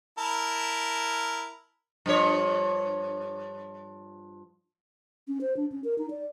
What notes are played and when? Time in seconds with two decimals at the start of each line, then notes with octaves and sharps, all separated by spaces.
0.18 E4 A#4 A5
2.06 G2 F3 C#5
5.28 C#4
5.41 C5
5.57 D4
5.72 C#4
5.84 A#4
5.98 D#4
6.10 D5